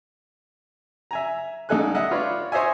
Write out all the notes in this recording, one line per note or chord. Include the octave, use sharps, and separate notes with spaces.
E5 G#5 A#5
G#2 G3 D#4 A4 G#5 F#6
D#5 E5 F#5
F4 B4 C#5 D5
C5 C#5 D#5 E5 G#5